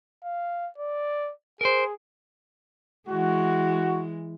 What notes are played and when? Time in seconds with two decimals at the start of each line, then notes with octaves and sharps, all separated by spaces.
0.24 F5
0.78 D5
1.61 G#4 A#4 C5
3.09 E3 G#3 F#4